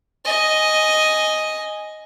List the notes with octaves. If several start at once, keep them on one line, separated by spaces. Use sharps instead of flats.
D#5 G#5